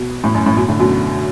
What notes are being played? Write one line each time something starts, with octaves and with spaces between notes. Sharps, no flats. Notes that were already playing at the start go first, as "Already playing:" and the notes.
Already playing: B2
A2
F#2
A2
F#2 B2
A2 D3
F#2 B2